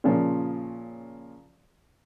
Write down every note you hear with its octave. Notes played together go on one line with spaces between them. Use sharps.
A#2 C#3 F3 C#4